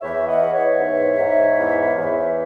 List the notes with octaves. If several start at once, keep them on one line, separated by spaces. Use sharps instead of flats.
E2 C#5 E5
D#5 F#5
E2
C#5 E5
G#2
G#2
E2
E2